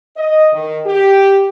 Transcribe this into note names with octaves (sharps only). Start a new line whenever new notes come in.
D#5
D#3
G4